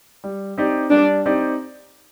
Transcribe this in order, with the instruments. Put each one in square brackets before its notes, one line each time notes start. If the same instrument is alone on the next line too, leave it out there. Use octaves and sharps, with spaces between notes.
[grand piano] G3
C4 D#4 G4 D5
[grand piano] G3 [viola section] D4
[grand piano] C4 D#4 G4 D5